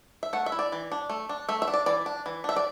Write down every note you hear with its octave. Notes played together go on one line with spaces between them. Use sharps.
E5
A3 F#5
E5
E4
D5
E3
D4
A3
D4
A3 E5
E5
D4
D5
E3 D5
D4
E3
D4 E5
D5